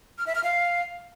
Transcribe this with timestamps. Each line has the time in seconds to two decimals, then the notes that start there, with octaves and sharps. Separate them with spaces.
0.18 F6
0.27 E5
0.35 F6
0.44 F5